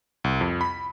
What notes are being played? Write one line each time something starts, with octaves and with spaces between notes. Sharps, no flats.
C2
F2
B5